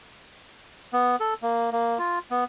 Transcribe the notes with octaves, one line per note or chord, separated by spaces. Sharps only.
B3
A4
A#3
A#3
F4
B3